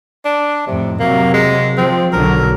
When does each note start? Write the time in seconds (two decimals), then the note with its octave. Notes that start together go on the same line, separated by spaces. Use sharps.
0.25 D4
0.67 F2 A2 C3
1.00 C3 F#3 A#3
1.34 G#3
1.78 F3 C4
2.13 B1 D3 F#3 A#4